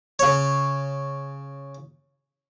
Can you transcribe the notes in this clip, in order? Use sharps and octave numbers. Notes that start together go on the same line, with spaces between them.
C#3 C#5